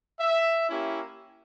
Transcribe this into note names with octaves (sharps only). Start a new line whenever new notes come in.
E5
A#3 C#4 E4 G4